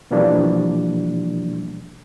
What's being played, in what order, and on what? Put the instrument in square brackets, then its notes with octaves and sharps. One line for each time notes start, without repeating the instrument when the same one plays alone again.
[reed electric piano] B2 E3 F3 G3 A#3 D4